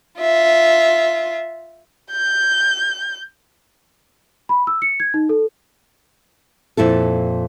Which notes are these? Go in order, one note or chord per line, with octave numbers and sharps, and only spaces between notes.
F4 E5
G6
B5
E6
C#7
G#6
D#4
A4
F2 A#2 E4 A4